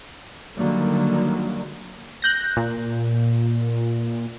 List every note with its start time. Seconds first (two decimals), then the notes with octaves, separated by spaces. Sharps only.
0.57 D3 D#3 F#3 G3 A#3
2.22 F#6 G6 A#6
2.57 A#2